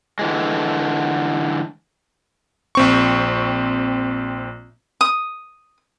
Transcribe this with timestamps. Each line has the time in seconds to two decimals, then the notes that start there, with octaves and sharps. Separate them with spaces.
0.19 D3 E3 G#3
2.75 A#1 C4 C#6
5.01 D#6